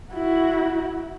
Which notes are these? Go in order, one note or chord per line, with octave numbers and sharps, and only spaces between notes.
E4 F#4